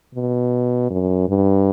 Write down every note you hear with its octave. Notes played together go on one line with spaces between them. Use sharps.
B2
F#2
G2